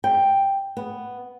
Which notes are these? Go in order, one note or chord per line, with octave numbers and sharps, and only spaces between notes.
G5
B3